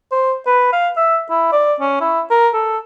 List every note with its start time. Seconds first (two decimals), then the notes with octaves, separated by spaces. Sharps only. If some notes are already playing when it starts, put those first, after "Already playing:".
0.12 C5
0.47 B4
0.73 F5
0.97 E5
1.30 E4
1.52 D5
1.80 C#4
2.01 E4
2.30 A#4
2.54 A4